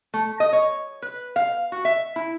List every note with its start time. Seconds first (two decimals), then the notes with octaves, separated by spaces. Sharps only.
0.14 A3
0.40 D#5
0.53 C#5
1.02 B4
1.36 F5
1.72 F#4
1.85 E5
2.16 E4